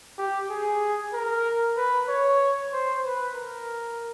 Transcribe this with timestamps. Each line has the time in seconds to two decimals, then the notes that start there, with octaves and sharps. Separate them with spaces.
0.18 G4
0.50 G#4
1.13 A#4
1.77 B4
2.09 C#5
2.73 C5
3.04 B4
3.35 A#4